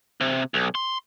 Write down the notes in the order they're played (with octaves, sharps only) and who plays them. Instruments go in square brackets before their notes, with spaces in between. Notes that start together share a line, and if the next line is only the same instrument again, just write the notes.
[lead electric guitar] C3
B1
C6